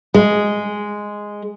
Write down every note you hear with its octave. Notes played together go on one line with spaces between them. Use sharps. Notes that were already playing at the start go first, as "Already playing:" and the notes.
G#3